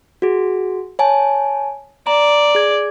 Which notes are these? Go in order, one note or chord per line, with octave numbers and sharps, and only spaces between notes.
F#4 G#4
C#5 G#5 A5
D5 A#5
G#4 G#6